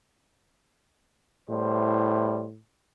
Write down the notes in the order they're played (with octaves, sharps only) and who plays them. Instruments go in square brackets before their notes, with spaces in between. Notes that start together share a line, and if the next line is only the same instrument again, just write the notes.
[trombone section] E2 G3 C5 [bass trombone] A2